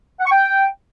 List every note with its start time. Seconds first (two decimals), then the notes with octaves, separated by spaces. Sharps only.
0.20 F#5
0.26 C#6
0.31 G5